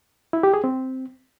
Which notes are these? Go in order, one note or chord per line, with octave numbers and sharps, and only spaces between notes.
E4
G4
G#4
C4